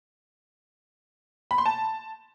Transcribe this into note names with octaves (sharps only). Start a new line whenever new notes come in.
B5
C6
A5